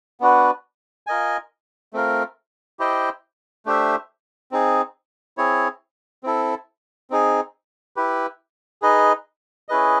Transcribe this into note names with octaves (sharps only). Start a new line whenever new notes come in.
B3 D4 F#4 B4
F4 A#4 D#5 G#5
A3 C4 F4 A#4
E4 G4 C5 D#5 G5
A3 D4 G4 C5 E5
C4 D#4 G#4
C4 E4 G#4 C#5
C4 E4 A4
C4 D#4 G#4
E4 G4 B4
D#4 G#4 B4 D#5
C#4 E4 G#4 B4 D#5